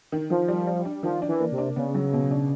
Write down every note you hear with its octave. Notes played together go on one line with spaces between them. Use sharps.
D#3
D#3 F3
G3
G3
D4
D#3 F3
D4
E3
A#3
C3
D4
C#3 B3
F#3
B2
D4